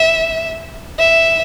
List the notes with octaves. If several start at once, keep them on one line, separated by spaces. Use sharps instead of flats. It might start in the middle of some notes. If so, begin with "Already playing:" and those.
Already playing: E5
E5